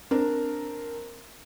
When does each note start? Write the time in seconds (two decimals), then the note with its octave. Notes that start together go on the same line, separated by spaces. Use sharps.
0.11 C4 D4 A#4